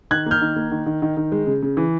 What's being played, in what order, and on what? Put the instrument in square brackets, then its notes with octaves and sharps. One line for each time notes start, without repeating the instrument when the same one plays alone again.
[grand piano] D#3 F#6 G#6
A#3 F6 G6
D#3
A#3
D#3
D#3
D#3
D#3
G#3
C#3
C#3
E3